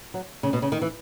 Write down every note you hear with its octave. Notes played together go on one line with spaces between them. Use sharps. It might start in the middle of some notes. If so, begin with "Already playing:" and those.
F#3
C#3
B2
C#3
D#3
E3